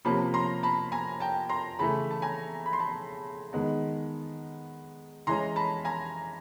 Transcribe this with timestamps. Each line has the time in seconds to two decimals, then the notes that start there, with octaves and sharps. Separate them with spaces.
0.05 C3 F3 A#3 C#4 A5 B5
0.34 A#5 C6
0.63 A5 B5
0.92 G#5 A#5
1.20 G5 A5
1.49 A#5 C6
1.79 C#3 E3 A3 A5 B5
2.11 A5
2.22 G#5 A#5
2.66 B5
2.73 C6
2.79 A5 B5
3.53 D#3 G#3 B3
5.27 E3 G#3 C#4 A#5 C6
5.56 A5 B5
5.85 G#5 A#5